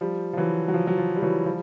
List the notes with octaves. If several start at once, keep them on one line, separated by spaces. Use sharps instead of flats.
F3 G3
F3
E3 F#3
F#3
F3
F#3
F3
G3
E3 F#3
F3 G3